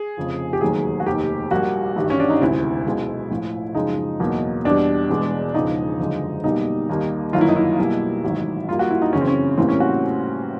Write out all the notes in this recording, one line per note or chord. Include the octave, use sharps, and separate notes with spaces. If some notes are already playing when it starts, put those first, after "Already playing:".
Already playing: G#4
F1 F2 C#3 F3
G4
E1 D#2 D#3 F#3 A3 G#4
F#4
F1 D#2 D#3 G4
A#1 A#2 G3 A#3 F#4
A1 G2 D#3 G3
C#4
D4
D#4
E1 D2 C3 E4
B1 B2 G#3
A#1 A2 F3
F#2 C#3 F3 G#3 D#4
E2 B2 F#3 A#3
E2 B2 G3 D4
E1 E2 B2 G#3
E1 E2 C#3 F3 D#4
F#1 F#2 D3 F3 G#3
B1 B2 G3 A#3 D#4
D#2 D#3 G3 A#3
G1 F#2 D#3 F#3 A#3 F4
E4
D#4
E4
B1 B2 G3 A#3
A1 G#2 D#3 F#3
A#1 A#2 G3 A#3 F4
F#4
E4
D#4
F#2 C#3 E3 C#4
C4
C#4
A#1 A2 E3 G3 A#3 C4
C#4
F#4